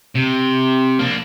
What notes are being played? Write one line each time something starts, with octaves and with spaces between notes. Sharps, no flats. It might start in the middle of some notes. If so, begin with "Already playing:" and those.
C3
A#3 D4